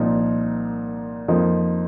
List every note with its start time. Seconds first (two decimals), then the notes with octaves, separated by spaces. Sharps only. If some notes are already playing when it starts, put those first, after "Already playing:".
Already playing: C2 A#2 F3 D#4
1.28 F2 F3 A#3 D#4